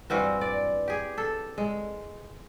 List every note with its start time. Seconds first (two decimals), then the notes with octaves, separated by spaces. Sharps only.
0.10 G2 E3 C4 F#4
0.41 D5
0.88 G4 G#4
1.18 A4
1.58 G#3